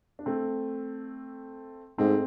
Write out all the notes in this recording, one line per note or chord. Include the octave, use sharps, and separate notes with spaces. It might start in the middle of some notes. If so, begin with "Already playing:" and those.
D4
A3 C4
G#2 A3 C4